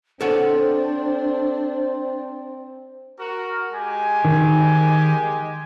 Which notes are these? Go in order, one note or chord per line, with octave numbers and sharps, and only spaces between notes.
C4 D4 A4 C5 C#5 F#5
F#4 A#4
G#3 G4 G#5
D#3